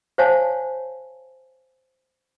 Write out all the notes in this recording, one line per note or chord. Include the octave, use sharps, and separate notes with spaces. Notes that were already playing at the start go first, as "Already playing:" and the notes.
C5 C#5 F5 F#5 G#5 A5